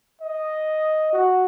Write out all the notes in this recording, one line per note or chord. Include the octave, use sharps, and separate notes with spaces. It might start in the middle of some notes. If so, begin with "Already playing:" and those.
D#5
F#4